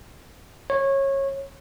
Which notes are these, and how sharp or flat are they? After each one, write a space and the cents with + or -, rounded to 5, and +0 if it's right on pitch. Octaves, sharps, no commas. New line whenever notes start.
C#5 -20